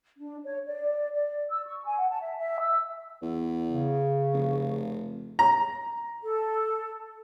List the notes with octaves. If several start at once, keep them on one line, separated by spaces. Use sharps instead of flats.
D4
C#5
D5
D5
E6
C#6
G#5
F#5
A5
E5
E5
E6
E2
C#3
F1
A#5
A4